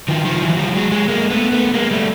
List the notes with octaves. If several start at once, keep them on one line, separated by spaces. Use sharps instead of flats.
D#3 F3
D#3 F3
E3 F#3
F3 G3
F#3 G#3
F#3 G#3
G#3 A#3
A3 B3
A3 B3
G#3 A#3
G3 A3